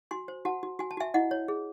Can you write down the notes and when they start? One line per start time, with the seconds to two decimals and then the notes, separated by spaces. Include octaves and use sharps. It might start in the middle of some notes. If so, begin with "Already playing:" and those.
0.11 F#4 G#5 C6
0.28 C5
0.45 F#4 F#5 A5
0.63 F#4
0.79 F#4 G#5
0.91 A5
0.97 F#4 E5 G#5
1.14 E4 D#5 F#5
1.31 C#5
1.48 G#4